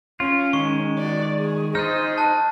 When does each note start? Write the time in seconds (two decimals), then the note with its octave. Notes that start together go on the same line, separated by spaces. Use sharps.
0.20 C#4 F4
0.53 D#3 G#3 C#6
0.98 F#4 D5
1.36 G#4
1.75 D#4 G#4 C5 D#5 F6 G6 A6
2.18 A5 F#6